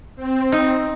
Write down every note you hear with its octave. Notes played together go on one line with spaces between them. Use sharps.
C4
D#4